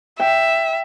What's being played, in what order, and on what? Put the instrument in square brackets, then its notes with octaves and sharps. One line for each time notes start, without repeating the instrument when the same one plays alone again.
[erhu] E5 [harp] G5